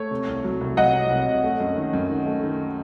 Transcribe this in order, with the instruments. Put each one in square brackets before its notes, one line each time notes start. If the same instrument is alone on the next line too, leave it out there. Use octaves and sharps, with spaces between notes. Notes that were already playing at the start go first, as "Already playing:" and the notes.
Already playing: [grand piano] A3 [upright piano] C#5
[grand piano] C3
C2
F#3
C2
[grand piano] F#3 [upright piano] D#5 F#5
[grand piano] C3
C2
C2
A3
F#2
D#3
F#2
D#3
A3
D#3